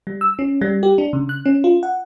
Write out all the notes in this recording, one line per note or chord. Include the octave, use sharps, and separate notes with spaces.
G3
E6
C#4
G3
G4
D4
C#3
F#6
C#4
F4
F#5